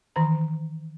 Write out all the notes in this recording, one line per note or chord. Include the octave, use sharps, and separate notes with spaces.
D#3 E3 A#5